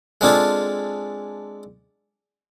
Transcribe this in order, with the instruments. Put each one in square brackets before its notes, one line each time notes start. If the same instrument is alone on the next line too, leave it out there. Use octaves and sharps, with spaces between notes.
[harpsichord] G#3 C4 D4 F4 G#4 A4